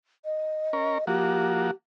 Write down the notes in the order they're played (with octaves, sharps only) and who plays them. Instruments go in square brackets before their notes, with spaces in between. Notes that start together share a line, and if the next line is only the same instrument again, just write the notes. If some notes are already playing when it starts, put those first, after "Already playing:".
[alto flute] D#5
[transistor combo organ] C#4 A#4
[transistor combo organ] F3 A#3 F#4 [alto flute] G4